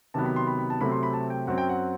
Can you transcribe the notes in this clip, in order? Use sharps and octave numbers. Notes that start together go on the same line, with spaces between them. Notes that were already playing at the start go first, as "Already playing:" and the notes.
C3 D#3 F#3 B3 A5
B5
C6
B5
B5
A5
C3 F#3 A3 C4 B5
C6
B5
A5
G5
F#2 F#3 C4 F#5
G5
F#5